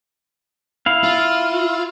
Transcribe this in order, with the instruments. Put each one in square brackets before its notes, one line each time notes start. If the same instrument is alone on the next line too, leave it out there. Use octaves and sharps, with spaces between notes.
[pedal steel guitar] E4 F5
[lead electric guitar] F4